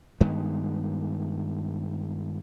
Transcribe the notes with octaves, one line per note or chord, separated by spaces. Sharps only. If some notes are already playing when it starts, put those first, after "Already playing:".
G2 D#3 G#3 B3